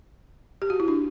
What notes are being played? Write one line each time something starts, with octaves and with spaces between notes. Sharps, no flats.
G4
F#4
E4
D4